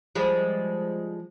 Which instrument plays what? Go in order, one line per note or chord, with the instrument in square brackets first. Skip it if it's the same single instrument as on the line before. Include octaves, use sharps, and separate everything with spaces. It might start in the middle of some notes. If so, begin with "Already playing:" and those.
[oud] F3 G3 G#3